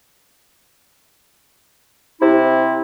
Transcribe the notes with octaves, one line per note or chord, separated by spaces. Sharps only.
C3 E4